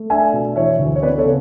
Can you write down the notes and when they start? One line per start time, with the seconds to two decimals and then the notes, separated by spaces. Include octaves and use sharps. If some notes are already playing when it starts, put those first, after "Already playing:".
Already playing: A3
0.10 D4 E5 G#5
0.33 B2
0.56 E3 C#5 E5
0.79 D2
0.96 C#5
1.02 B3 B4 D5
1.18 A4 C#5
1.25 C#3